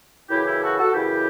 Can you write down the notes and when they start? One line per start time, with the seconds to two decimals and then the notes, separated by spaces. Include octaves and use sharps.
0.30 F#2 C#3 E3 E4 G4
0.46 E4 G4
0.62 F#4 A4
0.78 F#4 A4
0.94 F#2 C#3 E3 E4 G4